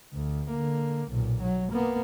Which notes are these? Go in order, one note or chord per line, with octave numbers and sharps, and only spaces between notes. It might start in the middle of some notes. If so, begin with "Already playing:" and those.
D2
D3 A#3
B1 A#2
F#3
A#3 B3